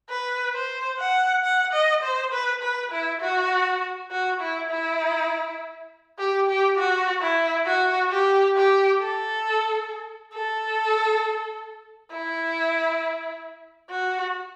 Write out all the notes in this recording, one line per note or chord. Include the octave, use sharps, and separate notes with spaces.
B4
C5
F#5
F#5
D#5
C5
B4
B4
E4
F#4
F#4
E4
E4
G4
G4
F#4
E4
F#4
G4
G4
A4
A4
E4
F#4